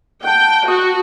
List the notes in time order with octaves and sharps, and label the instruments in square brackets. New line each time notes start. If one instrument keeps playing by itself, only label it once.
[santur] F#5 A5 [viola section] G5
[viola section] F#4 [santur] F#5 D#6